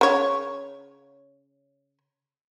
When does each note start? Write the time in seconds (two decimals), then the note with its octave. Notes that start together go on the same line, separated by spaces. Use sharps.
0.01 C#3 C#5